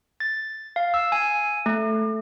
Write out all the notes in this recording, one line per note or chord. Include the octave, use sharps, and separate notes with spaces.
A6
F5
E6
G#5
A3